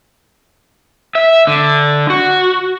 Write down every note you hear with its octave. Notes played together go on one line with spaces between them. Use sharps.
E5
D3
F#4